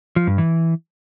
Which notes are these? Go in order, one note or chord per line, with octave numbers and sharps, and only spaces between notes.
F3
G2
E3